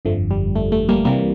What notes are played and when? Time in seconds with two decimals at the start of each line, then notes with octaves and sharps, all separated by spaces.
0.05 G1 F2 D3 F3 A3
0.31 G3
0.56 A3
0.72 A3
0.89 G3 A#3
1.05 C2 C3 E3 G3 A#3